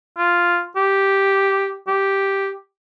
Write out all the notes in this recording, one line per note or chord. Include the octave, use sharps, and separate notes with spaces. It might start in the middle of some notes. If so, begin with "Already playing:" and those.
F4
G4
G4